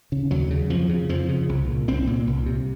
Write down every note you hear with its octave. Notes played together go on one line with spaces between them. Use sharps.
C#3
D#2 F#3
C#3
F2 F3
C#3
F2 F3
C#3
C2
A#2
C2 C4
A#2
C2
C3